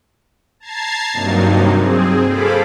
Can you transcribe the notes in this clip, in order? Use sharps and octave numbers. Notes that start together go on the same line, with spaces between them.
A5 A#5 G#6 A6 C7
G2 C3 F#3 A#3 D#4
C4 G#4
G#4 A4 C5 F5 B5 D6